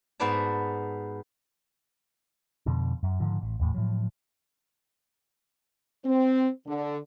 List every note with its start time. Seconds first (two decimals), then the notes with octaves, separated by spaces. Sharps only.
0.20 G#2 B3 F#4 B4 D5 A5
2.66 F2 B2 D3
3.03 F#2
3.20 G#2 D3 D#3 F3
3.41 A1
3.60 D#1 E2 A2
3.74 A2 F3 F#3
6.04 C4
6.66 D3